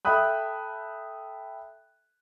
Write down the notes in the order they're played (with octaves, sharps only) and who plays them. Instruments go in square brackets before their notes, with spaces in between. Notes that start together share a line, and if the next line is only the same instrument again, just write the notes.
[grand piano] A4 E5 G5 B5 D#6 F#6